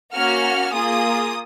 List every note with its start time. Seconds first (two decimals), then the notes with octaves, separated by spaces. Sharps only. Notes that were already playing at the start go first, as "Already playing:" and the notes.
0.15 A#3 C#4 F#4 F6
0.73 A#3 F4 G#4 D#6